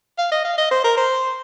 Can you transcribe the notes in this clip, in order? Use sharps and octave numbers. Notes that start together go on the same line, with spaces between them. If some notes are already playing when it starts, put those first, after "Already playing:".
F5
D#5
F5
D#5
C5
A#4
C5